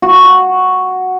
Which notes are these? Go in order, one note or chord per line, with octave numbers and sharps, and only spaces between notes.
F#4